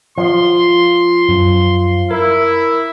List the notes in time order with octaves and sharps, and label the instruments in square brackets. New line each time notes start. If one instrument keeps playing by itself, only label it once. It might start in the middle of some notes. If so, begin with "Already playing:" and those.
[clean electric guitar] F3 [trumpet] C6
[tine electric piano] F#2
[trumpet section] E4 [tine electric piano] A#4